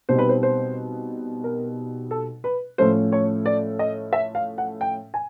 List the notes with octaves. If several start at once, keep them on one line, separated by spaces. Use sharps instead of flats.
B2 G3 C4 D#4 C5
B4
C5
C5
A#4
A4
B4
A2 F3 A3 C#4 C5
C#5
D5
D#5
E5
F5
F#5
G5
G#5